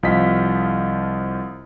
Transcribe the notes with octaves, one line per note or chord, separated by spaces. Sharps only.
C2 F3 D#5 F5 B6